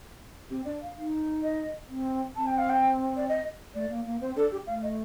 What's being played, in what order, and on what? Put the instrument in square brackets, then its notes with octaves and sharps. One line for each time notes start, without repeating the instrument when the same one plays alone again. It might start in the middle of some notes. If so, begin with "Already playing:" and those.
[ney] C4 [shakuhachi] G4
[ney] D4 [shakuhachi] D5
[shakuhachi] F5
[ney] D#4
[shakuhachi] D#5
[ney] C4
[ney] C4 [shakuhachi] A5
[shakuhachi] G5
F5
G5
D5
D#5
[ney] A3 [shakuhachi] D5
[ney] A#3
A#3
[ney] C4 [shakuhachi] C5
[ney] D4 [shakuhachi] A4
[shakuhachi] G4
[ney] A3 [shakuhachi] F5
[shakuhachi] D#5